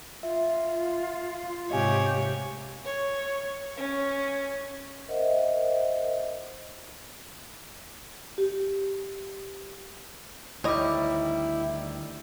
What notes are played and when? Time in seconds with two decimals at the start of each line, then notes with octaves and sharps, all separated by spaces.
0.23 F4 E5
1.71 G#2 C3 G4 C#5 D#5 F5 G#5
2.85 C#5
3.77 C#4
5.08 A#4 C5 D#5 E5 F#5
8.38 G4
10.64 D2 D#3 G3 E4 C#5 D#5 B5 D6